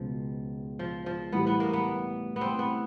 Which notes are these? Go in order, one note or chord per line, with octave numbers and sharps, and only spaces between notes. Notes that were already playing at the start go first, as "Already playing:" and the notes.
Already playing: C#2 B2 F3 G#3
F3
F3
A2 E3 G3 B3
B3
A#3
B3
B3
C4
B3